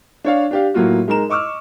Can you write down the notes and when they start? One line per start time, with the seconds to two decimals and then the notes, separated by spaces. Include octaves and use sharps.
0.25 D4 C#5 F5
0.51 D4 G4 F5
0.74 A2 F#3 A#3 F4 F#4
1.08 G#3 D#4 A#4 A#5 E7
1.29 D#5 C#6 D6 E6 F6